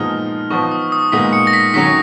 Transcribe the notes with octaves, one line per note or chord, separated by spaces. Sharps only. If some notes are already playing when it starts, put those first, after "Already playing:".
Already playing: A#2 F3 G#3 B3 D#4 F6
F3 B3 D#4 C#6
D#6
D#6
A#2 G#3 B3 D#4 B6
C#7
A#6
B6
D#3 F#3 C#4 B6